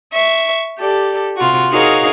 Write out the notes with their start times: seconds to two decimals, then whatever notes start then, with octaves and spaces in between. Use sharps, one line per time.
0.13 E5 C#6
0.78 G4 A4 D5
1.37 C3 F4 F#4
1.71 D#4 F#4 G#4 A#4 C#5 F5